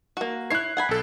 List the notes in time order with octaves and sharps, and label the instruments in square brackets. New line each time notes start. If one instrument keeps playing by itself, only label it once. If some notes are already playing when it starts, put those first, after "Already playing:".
[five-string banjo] A#3 F#4
[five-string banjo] E4 C#5 [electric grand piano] F#6 C7
[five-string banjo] F#5 G#5 B5
[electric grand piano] B1 A4